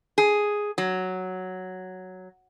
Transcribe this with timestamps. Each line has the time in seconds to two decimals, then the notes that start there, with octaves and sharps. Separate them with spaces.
0.18 G#4
0.78 F#3